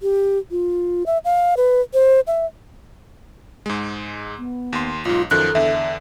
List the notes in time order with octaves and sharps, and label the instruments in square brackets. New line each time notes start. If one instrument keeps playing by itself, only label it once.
[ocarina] G4
F4
E5
F5
B4
C5
E5
[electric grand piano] G#2 G#3
[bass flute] B3
[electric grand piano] D#2 C6
[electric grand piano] B1 G#2 [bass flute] F4
[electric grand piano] F#2 D#3 F3 [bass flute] A4 [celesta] F#6
[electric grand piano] E2 D3 [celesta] E5